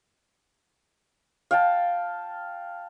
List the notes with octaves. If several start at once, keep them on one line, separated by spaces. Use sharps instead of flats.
F5 G5 A5